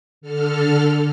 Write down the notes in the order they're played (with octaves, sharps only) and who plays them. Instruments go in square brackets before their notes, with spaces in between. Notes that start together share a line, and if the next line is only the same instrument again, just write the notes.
[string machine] D3 A4 F6